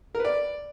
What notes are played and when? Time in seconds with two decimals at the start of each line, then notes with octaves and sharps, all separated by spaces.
0.15 A#4
0.20 B4
0.25 D5